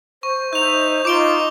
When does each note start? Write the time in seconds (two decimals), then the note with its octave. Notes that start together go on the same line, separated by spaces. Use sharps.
0.23 C5 C#6
0.53 D#4 E5 G6 F7
1.05 D#4 F4 D6 D7 G7